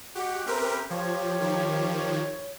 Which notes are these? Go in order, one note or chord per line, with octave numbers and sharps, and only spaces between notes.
G#3 F#4 G4 F#5
A3 C4 C#4 G4 A#4 B4
F3 G4 C#5
D#3 F3